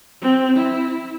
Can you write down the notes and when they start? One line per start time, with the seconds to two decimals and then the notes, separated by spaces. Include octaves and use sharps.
0.22 C4
0.57 E4